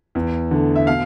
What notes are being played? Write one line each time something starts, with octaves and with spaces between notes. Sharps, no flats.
E2
D3 A3
E5
B2 F5